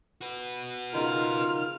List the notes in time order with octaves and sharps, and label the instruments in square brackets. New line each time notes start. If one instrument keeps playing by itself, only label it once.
[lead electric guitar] F#4 B4
[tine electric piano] C#3 D#4 A#4 [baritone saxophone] F4 [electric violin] F6